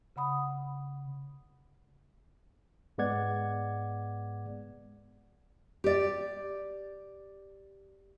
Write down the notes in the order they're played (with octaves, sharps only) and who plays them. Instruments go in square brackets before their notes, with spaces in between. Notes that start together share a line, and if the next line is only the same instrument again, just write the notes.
[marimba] C#3 F#5 B5 D#6
[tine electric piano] G#2 G#3 B3 D5 F#5 G#6
[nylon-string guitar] G4 D5